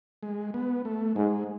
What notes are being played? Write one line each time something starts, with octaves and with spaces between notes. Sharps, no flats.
G#3
B3
A3
G#2 G#3